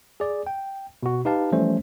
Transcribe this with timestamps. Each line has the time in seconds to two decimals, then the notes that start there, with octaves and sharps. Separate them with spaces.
0.20 G#4 D5
0.47 G5
1.03 B2 F#4
1.25 D#4 G4 B4 F5 A5
1.52 E3 F3 G3 A3 C#4 C5